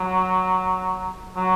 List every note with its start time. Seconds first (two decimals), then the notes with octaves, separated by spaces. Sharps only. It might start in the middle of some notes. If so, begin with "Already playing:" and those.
Already playing: F#3
1.36 F#3